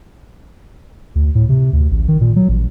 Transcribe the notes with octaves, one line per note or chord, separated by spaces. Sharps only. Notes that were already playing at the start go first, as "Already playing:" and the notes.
D2
A2
C3
D2
A1
D#3
A#2
F#3
A1